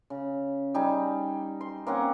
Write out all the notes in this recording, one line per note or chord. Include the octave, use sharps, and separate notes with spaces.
C#3
G3 D#4 G#4
C6
A#3 C4 C#4 F#5